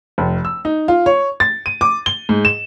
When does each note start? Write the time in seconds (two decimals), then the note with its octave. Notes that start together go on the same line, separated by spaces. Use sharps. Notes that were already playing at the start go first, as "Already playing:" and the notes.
0.18 F1
0.45 E6
0.65 D#4
0.88 F4
1.06 C#5
1.40 A6
1.66 D#7
1.81 D6
2.06 G7
2.29 G#2
2.45 E7